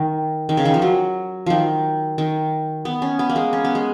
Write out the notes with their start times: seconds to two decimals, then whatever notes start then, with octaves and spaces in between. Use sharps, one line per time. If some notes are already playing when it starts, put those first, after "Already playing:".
Already playing: D#3
0.49 D#3
0.57 C#3
0.65 D#3
0.74 F3
0.82 F#3
1.46 D#3 F3
2.18 D#3
2.85 B3
3.02 C#4
3.19 B3
3.29 A#3
3.36 G#3
3.53 C#4
3.65 B3
3.75 G#3